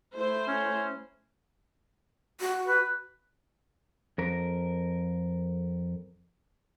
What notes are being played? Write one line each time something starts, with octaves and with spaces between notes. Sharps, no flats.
A3 E4 C5
C#4
F#4
B4
F2 A#4